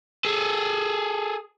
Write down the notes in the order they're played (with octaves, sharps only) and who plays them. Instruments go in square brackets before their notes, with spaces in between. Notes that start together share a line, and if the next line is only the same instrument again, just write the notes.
[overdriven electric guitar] G#4 A4